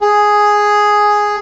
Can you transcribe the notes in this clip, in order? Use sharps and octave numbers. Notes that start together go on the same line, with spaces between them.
G#4